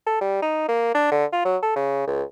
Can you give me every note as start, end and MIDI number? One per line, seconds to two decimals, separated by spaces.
0.06 0.17 69
0.21 0.41 55
0.42 0.66 63
0.68 0.92 58
0.95 1.11 62
1.12 1.25 50
1.33 1.41 65
1.45 1.57 54
1.63 1.72 69
1.76 2.06 49
2.07 2.22 37